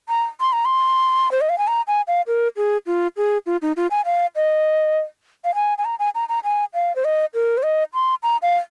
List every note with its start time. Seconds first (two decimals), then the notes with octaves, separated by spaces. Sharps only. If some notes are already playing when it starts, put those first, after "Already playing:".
0.09 A#5
0.41 C6
0.53 A#5
0.65 C6
1.32 C5
1.41 D#5
1.49 F5
1.58 G#5
1.68 A#5
1.88 G#5
2.08 F5
2.27 A#4
2.57 G#4
2.87 F4
3.17 G#4
3.46 F4
3.62 D#4
3.77 F4
3.91 G#5
4.05 F5
4.36 D#5
5.45 F5
5.55 G#5
5.78 G#5
5.85 A#5
5.99 G#5
6.15 A#5
6.29 A#5
6.44 G#5
6.74 F5
6.96 C5
7.05 D#5
7.34 A#4
7.57 C5
7.63 D#5
7.94 C6
8.23 A#5
8.42 F5